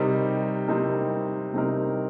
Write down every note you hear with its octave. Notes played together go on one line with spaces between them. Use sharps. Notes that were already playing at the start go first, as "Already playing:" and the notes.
Already playing: C3 G3 C4 D#4 A#4
C3 G3 C4 D#4 A#4
C3 G3 C4 D#4 A#4